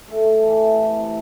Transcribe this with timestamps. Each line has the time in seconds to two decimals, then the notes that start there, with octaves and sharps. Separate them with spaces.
0.08 A3 A4
0.25 A3
0.44 E3 A4
0.62 C3
0.78 E3 E4
0.96 C3